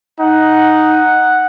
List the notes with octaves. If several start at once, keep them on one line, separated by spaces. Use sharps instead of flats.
D#4 F#5